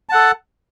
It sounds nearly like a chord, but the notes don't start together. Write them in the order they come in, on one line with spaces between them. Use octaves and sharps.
A5 F#5 A4